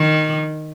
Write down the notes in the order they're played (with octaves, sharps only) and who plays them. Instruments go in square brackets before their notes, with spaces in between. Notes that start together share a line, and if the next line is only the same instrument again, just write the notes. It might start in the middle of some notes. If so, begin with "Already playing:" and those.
Already playing: [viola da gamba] D#3